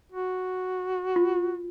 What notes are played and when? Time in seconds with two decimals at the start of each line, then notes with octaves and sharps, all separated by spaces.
0.12 F#4
1.16 F4